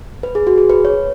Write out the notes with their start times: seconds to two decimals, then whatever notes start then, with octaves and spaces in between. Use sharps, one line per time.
0.23 B4
0.35 G#4
0.47 F#4
0.58 G#4
0.70 B4
0.85 C#5